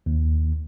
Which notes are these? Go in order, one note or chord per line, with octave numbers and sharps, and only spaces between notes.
D#2